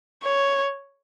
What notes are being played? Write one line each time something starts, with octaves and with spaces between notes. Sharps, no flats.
C#5